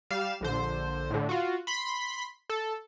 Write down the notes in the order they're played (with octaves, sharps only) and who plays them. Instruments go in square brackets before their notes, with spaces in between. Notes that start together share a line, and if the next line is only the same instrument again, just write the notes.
[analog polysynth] G3 F5 E7
A#1 D3 C5
A2 D3
F4 F#4
B5 C6 B6
A4